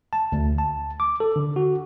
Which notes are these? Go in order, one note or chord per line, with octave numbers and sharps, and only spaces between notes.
A5
D2
A5
D6
A4
D3
F#4